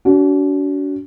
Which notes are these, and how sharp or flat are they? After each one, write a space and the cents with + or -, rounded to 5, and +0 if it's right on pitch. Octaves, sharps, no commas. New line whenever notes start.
D4 -45 F#4 +25